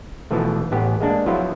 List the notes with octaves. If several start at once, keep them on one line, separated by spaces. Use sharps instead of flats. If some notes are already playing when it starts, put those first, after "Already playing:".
B2 E3 F3 A3
A1 B3 G4
G#3 A#3 D4
F3 F#3 B3 E4 F4